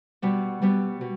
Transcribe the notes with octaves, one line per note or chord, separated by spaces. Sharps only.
B2 G3 B3
B2 G3 B3
B2